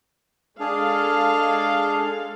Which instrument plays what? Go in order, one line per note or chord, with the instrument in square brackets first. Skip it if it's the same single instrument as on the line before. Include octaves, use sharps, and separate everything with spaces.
[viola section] G#3 A4 F5 [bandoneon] D4 G#4